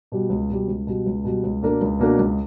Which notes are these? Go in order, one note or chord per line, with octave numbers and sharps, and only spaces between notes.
B2 G3
C#2
B2 G3
C#2
B2 G3
C#2
B2 G3
C#2
B2 A#3 D4 A#4
C#2
B2 A#3 D4 A#4
C#2